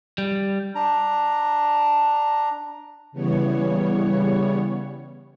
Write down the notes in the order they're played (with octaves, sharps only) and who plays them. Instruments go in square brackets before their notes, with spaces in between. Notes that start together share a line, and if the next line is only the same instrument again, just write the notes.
[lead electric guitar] G3
[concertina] D4 A#5
[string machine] C#3 E3 G3 B3 C#5